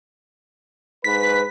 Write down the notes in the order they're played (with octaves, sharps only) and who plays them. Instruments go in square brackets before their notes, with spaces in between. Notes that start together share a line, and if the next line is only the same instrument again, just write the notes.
[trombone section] G#2 B4 [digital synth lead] B6